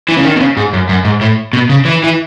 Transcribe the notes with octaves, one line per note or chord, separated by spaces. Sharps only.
E3
C#3
D#3
B2
C#3
G#2
F#2
F#2
G#2
A2
B2
C#3
E3
E3